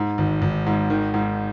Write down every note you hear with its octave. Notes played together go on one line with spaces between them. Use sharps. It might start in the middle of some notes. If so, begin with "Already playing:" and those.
Already playing: G#2
G#1
G#1
G#2
D#3
G#2